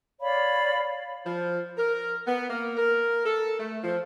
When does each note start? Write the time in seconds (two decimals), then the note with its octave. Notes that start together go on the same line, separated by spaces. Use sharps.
0.20 C#5 D5 F5 B5
1.25 F3
1.77 A#4
2.27 B3
2.50 A#3
2.77 A#4
3.26 A4
3.59 A3
3.83 F3